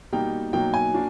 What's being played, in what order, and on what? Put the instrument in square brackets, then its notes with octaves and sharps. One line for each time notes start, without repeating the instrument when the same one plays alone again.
[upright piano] B2 G3 A#3 D#4 [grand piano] G5
[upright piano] B2 F#3 A#3 D#4 [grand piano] G5
[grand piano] G#5
[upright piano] A#3 D4 F#4